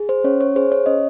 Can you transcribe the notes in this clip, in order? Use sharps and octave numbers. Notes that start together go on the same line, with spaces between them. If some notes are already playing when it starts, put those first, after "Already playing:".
Already playing: G#4
C5
C#4 C#5
C#5
G#4 C5
C#5
C#4 D#5